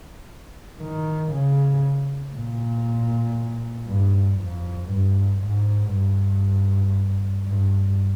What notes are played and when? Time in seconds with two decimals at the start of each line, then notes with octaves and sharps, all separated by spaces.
0.80 D#3
1.32 C#3
2.34 A#2
3.87 G2
4.39 F2
4.90 G2
5.42 G#2
5.93 G2
7.47 G2